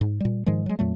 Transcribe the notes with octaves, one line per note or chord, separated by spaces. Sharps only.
G#2
A#2 G3
G#2 D#3 F3 G#3
F#3 G#3
F2 A#2 F#3 A3